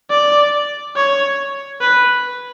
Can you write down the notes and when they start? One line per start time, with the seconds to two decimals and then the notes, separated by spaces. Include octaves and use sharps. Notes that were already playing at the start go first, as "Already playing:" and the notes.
0.10 D5
0.96 C#5
1.81 B4